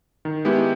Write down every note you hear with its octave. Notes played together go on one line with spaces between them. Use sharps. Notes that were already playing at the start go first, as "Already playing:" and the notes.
D#3
G#3 B3 E4 G4